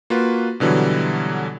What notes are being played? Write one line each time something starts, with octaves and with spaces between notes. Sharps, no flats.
A#3 F4 F#4 B4
B2 D3 E3 F#3 G3